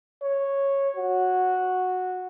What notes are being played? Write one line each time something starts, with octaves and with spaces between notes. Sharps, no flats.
C#5
F#4